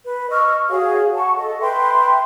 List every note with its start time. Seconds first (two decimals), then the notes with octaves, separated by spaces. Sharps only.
0.05 B4
0.31 D#5 C#6 E6 F6
0.69 F#4 G#4 C#5 F5
1.15 F#5 A5 C#6
1.37 A4 D#5
1.61 B4 E5 G5 C6